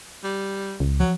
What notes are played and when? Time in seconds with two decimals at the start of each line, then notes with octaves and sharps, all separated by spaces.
0.24 G3
0.80 C#2
1.00 F3 F#3